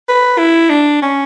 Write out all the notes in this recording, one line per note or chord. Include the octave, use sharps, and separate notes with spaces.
B4
E4
D4
C#4